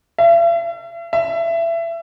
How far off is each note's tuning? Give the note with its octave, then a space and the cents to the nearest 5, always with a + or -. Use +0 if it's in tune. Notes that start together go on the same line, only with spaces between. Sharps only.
E5 +45
E5 +25